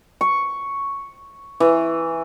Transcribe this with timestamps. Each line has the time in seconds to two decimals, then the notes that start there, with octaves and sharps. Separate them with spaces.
0.21 C#6
1.60 E3